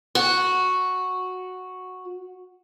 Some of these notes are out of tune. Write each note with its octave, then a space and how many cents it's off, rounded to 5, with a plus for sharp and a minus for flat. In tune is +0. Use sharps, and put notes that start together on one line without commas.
F#4 -5